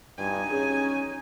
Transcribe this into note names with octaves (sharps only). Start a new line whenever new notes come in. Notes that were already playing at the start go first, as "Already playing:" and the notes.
G2 D#4 G#5
C#4 G#4